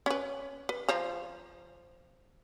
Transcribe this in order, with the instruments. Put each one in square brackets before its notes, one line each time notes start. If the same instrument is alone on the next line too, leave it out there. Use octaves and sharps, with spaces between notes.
[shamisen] C#4 B4
B4
F3 C5 A#5